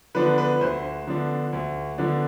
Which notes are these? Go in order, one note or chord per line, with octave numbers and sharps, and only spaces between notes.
D3 F3 B3 D4 B4
B4
D2 C5
D3 F3 B3 D4
D2
D3 F3 B3 D4